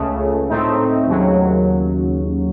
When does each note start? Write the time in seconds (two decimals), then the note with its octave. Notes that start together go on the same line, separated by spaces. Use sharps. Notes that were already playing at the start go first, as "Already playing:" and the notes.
Already playing: C#2 C#3 A3
0.49 A2 A3 C4 D#4
1.07 D#2 C#3 F#3